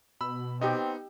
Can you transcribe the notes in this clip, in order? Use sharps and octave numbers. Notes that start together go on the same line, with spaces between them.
B2 B5 E6
B3 C4 D#4 G4 D#5